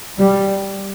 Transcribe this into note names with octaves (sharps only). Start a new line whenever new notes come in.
G3